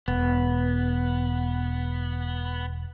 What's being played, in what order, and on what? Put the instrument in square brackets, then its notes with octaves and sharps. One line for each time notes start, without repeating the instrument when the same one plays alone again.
[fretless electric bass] E1 [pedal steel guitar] B3